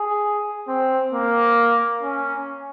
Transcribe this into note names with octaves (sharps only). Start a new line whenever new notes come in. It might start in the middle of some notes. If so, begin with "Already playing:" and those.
Already playing: G#4
C4
A#3
C#4